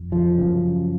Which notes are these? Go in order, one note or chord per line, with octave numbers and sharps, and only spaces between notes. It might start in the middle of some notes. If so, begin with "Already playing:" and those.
Already playing: F2
F3
F#2 C#3